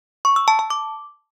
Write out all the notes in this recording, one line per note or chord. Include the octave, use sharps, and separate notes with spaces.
C#6
E6
A5
A5
D6